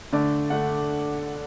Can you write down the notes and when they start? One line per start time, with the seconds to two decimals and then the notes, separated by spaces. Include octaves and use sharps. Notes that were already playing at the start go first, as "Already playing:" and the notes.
0.13 D3 A3 D4 D5
0.50 D3 A3 D4 F#5